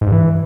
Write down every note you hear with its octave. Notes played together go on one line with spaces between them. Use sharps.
G#2
G2
E3